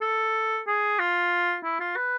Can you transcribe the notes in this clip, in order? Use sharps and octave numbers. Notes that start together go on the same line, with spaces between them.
A4
G#4
F4
E4
F4
B4